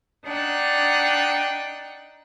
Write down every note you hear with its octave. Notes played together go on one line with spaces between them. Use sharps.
D4 D#4 F#5 G5